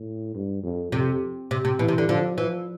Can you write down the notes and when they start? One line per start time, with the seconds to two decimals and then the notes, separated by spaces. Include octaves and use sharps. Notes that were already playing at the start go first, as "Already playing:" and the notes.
Already playing: A2
0.35 G2
0.63 F2
0.92 F2 C3
1.51 C3
1.65 C3
1.79 B2 E3
1.88 C3
1.98 D3
2.08 D3 F3
2.37 E3 F3